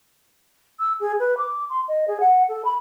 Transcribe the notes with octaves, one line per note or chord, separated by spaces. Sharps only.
E6
G#4
B4
D6
C6
D#5
G#4
F#5
A4
B5